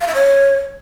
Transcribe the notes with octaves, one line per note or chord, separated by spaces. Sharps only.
F5
E5
C#5